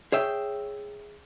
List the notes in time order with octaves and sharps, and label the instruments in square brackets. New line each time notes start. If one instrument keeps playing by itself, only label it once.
[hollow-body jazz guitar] G#4 C#5 E5 G5